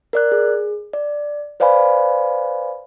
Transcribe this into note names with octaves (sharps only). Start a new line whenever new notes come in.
A#4 D5 F#6
G#4
D5
B4 C5 D5 F5 G#5 B5